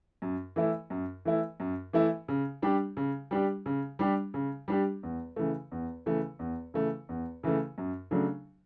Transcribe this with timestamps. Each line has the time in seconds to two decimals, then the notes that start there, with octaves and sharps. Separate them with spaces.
0.22 F#2
0.56 E3 A3 E4
0.90 F#2
1.25 E3 A3 E4
1.60 F#2
1.93 E3 A3 E4
2.28 C#3
2.62 G3 D4 G4
2.97 C#3
3.31 G3 D4 G4
3.66 C#3
3.99 G3 D4 G4
4.34 C#3
4.68 G3 D4 G4
5.03 E2
5.36 C#3 E3 A3
5.72 E2
6.06 C#3 E3 A3
6.39 E2
6.74 C#3 E3 A3
7.09 E2
7.43 C#3 E3 A3
7.78 F#2
8.11 C#3 F#3 A3 D4